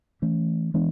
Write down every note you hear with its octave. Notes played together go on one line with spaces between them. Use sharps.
E3 A3 C#4
E3 G#3 B3 D4